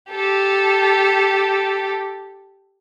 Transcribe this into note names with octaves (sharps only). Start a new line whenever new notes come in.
G4 A4